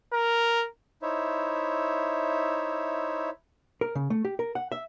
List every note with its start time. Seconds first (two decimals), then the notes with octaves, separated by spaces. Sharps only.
0.13 A#4
1.02 D#4 E4 C5 C#5 E5
3.81 A#4
3.95 C#3
4.10 A3
4.25 G4
4.39 A#4
4.55 F#5
4.72 E5